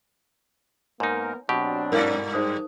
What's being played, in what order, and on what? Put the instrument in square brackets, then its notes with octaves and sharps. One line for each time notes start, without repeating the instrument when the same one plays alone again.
[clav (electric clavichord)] G#2 D#4 [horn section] A#3 B3 A#4 [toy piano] C#5
[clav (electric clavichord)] B2 G4 [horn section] F#3 C4 D4
[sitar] G2 D5 [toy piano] A#4 F5
[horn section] G3 G#3 [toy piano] D#4 C5 D#6